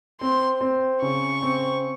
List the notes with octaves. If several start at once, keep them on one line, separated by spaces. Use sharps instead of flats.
C4 C6
C4
C#3 C#6
C4